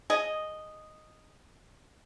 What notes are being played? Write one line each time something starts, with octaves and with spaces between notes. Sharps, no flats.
G#4 D#5